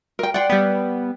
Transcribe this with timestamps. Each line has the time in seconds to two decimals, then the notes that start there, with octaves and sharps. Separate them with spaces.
0.19 A#4 G5
0.34 D5 F#5 G5 C6
0.50 G3 B3